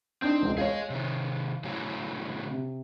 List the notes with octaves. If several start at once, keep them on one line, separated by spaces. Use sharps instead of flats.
C4 D4 D#4 G6
E1 C#2
G#4 C#5 D#5 F5
C3 D#3
A2 C#3 F#3
C3